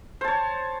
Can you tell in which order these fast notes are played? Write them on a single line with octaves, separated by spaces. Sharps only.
C5 A5 C#5